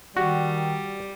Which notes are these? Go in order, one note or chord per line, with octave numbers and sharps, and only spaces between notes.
D#3 G3 F#4